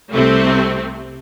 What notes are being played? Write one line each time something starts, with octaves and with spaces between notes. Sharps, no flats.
C2 C3 A3 C4